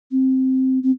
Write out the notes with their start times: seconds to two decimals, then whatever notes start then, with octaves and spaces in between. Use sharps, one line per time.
0.11 C4
0.83 C4